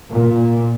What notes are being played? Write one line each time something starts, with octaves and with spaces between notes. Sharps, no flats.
A#2